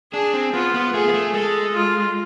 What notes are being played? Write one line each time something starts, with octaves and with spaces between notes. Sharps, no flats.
D4 G#4
C4
B3 F4
B3
A3 G#4
B3
A3
G#3 A4
F4